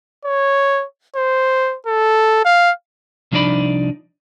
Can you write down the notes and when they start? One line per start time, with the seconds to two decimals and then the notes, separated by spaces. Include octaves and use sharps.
0.25 C#5
1.15 C5
1.87 A4
2.45 F5
3.32 C2 F3 D4 D#4 D5 B5